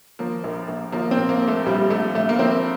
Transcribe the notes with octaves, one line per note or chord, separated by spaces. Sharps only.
F3 A#3
A#1
A#1
F3 A#3
C4
A#2
A#3
A#1
A3
A#1 G3
A#1 A3
A#1 A3
A#3
F3 C4